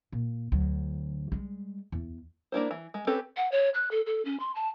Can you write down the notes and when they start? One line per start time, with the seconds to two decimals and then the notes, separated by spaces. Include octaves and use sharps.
0.12 A#2
0.52 D2 F#3
1.32 G3 G#3
1.92 E2
2.52 A#3 D4 E4 C5
2.71 E3
2.94 G#3
3.07 C4 C#4 G4 A4 B4
3.36 F#5
3.52 C#5
3.74 F#6
3.91 A4
4.06 A4
4.25 C#4
4.40 C6
4.55 A5